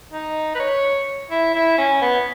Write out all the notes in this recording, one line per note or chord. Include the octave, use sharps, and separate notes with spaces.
D#4
B4
C#5
E4
E4
C#4
B3